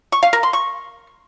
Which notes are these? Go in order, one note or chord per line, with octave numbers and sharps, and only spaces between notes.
C#6
F5
A#4
C6
C#6